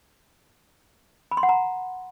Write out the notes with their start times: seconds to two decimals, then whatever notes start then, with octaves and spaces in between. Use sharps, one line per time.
1.31 B5
1.37 C6
1.43 F#5
1.49 A#5